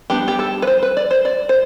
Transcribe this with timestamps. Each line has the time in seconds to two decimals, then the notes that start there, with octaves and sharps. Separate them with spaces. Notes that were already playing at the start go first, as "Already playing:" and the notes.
0.10 G3 B3 D4 G4
0.28 G4
0.39 A4
0.62 B4
0.67 C5
0.83 B4
0.97 D5
1.11 C5
1.25 D5
1.49 C5